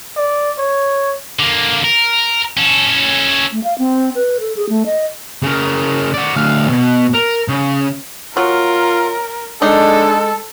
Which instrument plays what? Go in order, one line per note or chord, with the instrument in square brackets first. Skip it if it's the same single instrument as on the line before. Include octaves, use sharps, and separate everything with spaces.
[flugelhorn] D5
C#5
[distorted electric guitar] D3 A#3
A#4
C#4 A4
[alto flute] A3
F5
C4
B4
A4
G#4
A3
D#5
[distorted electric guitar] C#3 A#4
F#4 D5
D2 F5
B2
A#4
C#3
[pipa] F#3 [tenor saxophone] F4 [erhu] A#4
[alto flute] G#3 [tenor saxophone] D4 [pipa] D#4 [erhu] A4